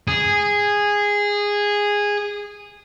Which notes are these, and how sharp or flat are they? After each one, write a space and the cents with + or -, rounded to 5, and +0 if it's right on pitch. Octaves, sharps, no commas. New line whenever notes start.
G#4 -10